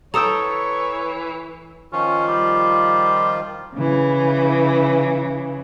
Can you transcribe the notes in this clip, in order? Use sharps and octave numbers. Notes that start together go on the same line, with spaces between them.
E3 A4 C#5 G5 A#5 D#6 E6
D#3 F3 C#4 F4
G3
C#3 E3